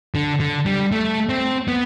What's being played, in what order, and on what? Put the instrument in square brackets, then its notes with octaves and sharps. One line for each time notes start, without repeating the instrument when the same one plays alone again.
[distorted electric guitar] D3
D3
G3
A3
C4
B3